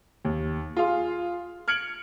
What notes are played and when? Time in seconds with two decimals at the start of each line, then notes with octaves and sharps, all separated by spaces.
0.25 D#2
0.77 F4 G#4 F5 C6
1.68 F6 G#6 C#7 D7 F#7